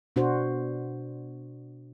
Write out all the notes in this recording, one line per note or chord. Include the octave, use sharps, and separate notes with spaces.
B2 D4 F#4 C5